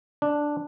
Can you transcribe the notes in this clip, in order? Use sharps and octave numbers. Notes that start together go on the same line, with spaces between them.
D4